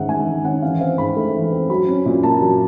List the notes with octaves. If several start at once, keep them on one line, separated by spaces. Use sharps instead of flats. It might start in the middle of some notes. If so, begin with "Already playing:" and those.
Already playing: G#2 D#3 C#4 E5 F#5
G#3 G#5
D#3
C#4 F#5
E3 F5
C4 F5
G#2 B5
A3
E3
C4
F#3 B5
C#4
A#2
A#3 A5
F#3 A5